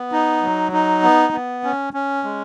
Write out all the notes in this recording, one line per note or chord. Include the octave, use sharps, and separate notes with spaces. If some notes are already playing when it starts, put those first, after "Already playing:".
Already playing: B3
D#4
F#3
D#4
B3
B3
C#4
C#4
G#3